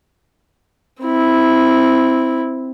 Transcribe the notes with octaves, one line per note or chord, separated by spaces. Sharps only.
C4 E4